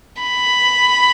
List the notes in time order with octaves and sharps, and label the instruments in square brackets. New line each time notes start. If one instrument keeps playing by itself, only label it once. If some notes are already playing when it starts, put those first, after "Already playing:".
[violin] B5